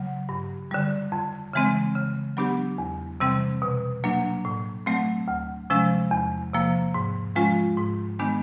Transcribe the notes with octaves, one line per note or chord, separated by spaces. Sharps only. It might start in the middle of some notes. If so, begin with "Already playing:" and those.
Already playing: C#3 F#3
G2
D3 G3
F2
C#3 E3 G#3 C4
C#3
F#3 B3 D4 G4
E2
C3 E3 G3 C4
B2
F#3 A#3 D4
A2
F#3 A3 C4
D2
C3 F3 G#3 C#4
E2
C3 F3 A#3
G#2
F3 G#3 C#4 F4
G#2
D#3 G#3 B3 D4